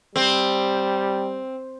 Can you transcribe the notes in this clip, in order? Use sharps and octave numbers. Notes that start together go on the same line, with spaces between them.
G3 C4